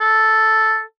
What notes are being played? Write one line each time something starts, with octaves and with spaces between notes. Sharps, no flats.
A4